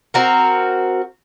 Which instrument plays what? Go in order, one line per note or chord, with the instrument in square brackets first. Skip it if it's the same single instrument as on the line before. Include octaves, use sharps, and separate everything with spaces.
[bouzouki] C4 F#4 A#4